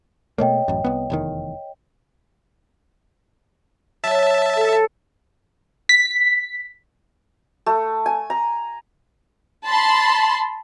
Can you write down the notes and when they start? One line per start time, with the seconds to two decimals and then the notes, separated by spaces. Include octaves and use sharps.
0.38 B2 A3 A#3 C#5 D#5 G5
0.68 A1 F#2
0.84 C2 B3
1.10 F1 E2 D#3
4.04 F#3 E5 A5
4.56 A4
5.89 B6
7.66 A3
8.06 G#5
8.30 A#5
9.66 A5 B5 C6